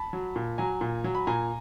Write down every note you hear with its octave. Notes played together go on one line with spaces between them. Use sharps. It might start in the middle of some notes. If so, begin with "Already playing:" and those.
Already playing: A5 B5
F#3
A#2
F#3 G#5 A#5
A#2
F#3
B5
A#2 G#5 A#5